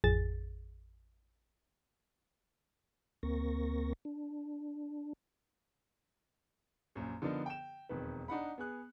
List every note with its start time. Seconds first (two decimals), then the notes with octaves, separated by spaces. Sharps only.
0.04 A1 F2 G#4 A6
3.23 D2 A#3 C4 A#4 C#6 A#6
4.05 D4
6.95 A#1 F#2
7.22 D3 F3 B3 D4 D#4 A#4
7.46 G5 E7
7.89 E1 F2 D#3 B4
8.28 D4 D#4 F#5 B5
8.58 B3 G#4 F#6